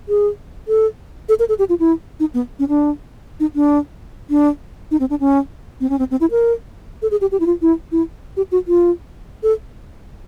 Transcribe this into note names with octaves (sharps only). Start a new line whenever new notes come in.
G#4
A4
A4
A#4
A4
G4
F4
E4
D#4
B3
C#4
D4
D#4
D4
D4
D#4
C4
D4
C#4
C4
C#4
C4
C4
E4
A#4
A4
G#4
G4
G4
E4
F4
E4
E4
G4
F#4
F4
A4